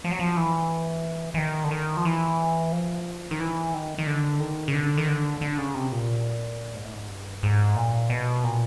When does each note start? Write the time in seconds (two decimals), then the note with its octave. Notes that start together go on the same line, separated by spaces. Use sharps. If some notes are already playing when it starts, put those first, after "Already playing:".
0.04 F3
0.11 F#3
0.20 F3
0.37 E3
1.34 E3
1.38 D#3
1.64 D3
1.71 D#3
1.97 F3
2.05 E3
2.72 F3
3.31 D#3
3.40 E3
3.74 D#3
3.98 D#3
4.07 D3
4.40 D#3
4.68 C#3
4.73 D3
4.98 D#3
5.08 D3
5.41 D3
5.58 C#3
5.74 C3
5.92 A#2
6.75 G#2
6.84 A2
6.92 G#2
7.09 G2
7.43 G#2
7.76 A#2
8.10 B2
8.44 A#2